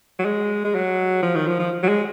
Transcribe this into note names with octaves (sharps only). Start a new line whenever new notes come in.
F#3
G#3
G#3
F#3
F3
D#3
F3
F3
F#3
G#3